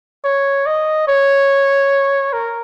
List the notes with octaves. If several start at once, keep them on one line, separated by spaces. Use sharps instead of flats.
C#5
D#5
C#5
A#4